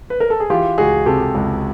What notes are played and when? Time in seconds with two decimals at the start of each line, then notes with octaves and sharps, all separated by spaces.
0.10 B4
0.20 A#4
0.30 A4
0.40 G#4
0.50 E3 F4 G4
0.78 C#2 F#4 G#4
1.06 C3 G4 A4
1.35 C#2